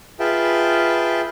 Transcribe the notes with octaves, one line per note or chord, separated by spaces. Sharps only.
F4 G#4 B4 E5 G5 A5